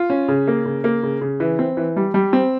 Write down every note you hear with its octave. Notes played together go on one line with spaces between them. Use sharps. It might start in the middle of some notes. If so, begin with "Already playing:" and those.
Already playing: F4
C#4
C#3
A#3
C#3
A#3
C#3
C#3
E3
C4
E3
G3
G3
C4